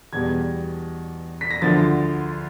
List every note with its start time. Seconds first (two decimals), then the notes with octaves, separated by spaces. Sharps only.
0.13 E2 B2 G3 G#6
1.41 B6
1.51 A#6
1.62 D2 D3 F3 A6